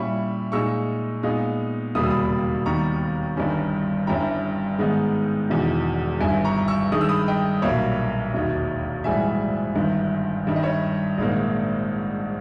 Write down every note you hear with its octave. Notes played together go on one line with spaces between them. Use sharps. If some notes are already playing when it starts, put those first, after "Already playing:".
Already playing: A#2 G3 C#4 E4 C#6
A#2 G#3 D#4 C#6 E6
A#2 G#3 B3 D#4
E1 D#2 C#3 G3 A#3 D#6
E6
B5 D#6
D#2 D#3 G3 B3 A#5 C#6
G1 G2 D#3 G3 C#4
G1 G2 G3 C#4 E4 G5 A#5
G#2 D#3 G#3 B3 D#4
E1 E2 D#3
G1 G2 D#3 E5 G#5
A#5 C#6
C#6 E6
G2 D#3 G#3 D#6
E6
B5 D#6
D#5 G5
B1 A#2 G3 A#3 C#5 E5
E1 D#2 D#3
A#1 G#2 E3 G3 E5 G#5
G1 G2 D#3
G2 D#3 G3 E5
D#5
C#5 E5
A#1 G#2 D#3 A#3